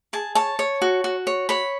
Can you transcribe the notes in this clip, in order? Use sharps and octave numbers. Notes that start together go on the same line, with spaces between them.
G#4 A5
C#5 A5
C#5
F#4
F#4
C#5
C#5 B5